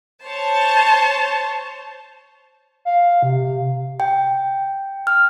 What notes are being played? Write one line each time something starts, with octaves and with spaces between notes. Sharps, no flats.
C5 C#5 A5
F5
C3
G5
F6